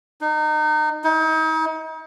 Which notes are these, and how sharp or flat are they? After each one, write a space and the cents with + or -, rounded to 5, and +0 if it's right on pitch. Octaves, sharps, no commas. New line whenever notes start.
D#4 -30
D#4 +40